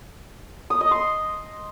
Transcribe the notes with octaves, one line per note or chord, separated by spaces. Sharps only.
D#6
D#5
C6